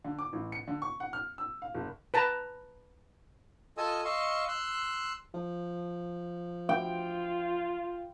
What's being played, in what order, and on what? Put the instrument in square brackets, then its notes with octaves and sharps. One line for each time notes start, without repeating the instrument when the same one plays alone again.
[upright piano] D3
D6
A1
C#7
D3
C#6
F#5
F6
E6
F5
F#1
[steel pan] B4 A5 A#5
[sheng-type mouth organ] F4 A4 D#5 G#5 D#6 E6
D#5 F5 C6 C#6 E6
C6 E6 F#6
[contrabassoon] F3
[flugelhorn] F4 [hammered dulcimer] G5